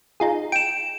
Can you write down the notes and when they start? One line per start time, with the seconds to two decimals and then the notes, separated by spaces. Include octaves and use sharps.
0.20 D#4 F4 G#4
0.52 G5 D7 E7